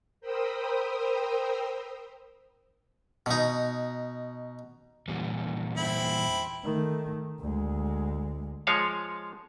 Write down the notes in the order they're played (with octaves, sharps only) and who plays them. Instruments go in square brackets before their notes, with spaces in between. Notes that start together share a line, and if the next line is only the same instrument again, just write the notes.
[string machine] A#4 C5 G5 B5 D#6 E6
[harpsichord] B2 D#4
[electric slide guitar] E2 A#2 G3
[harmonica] C4 E4 B5
[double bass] D#3 A3
D2 G#3
[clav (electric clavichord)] F3 G#3 C#5 F5